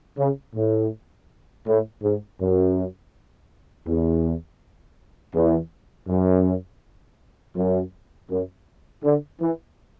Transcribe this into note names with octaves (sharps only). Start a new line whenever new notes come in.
C#3
A2
A2
G#2
F#2
E2
E2
F#2
F#2
F#2
D3
E3